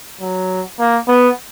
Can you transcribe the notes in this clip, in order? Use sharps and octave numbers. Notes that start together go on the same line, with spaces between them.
F#3
A#3
B3